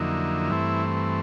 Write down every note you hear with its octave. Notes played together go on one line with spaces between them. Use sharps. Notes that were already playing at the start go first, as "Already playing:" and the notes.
Already playing: F2 D3 F#3 A#3 D#4 E4
G2 E3 A3 C4